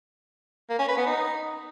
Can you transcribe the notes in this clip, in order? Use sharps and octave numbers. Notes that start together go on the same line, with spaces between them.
A#3
C#4
B4
B3
D#4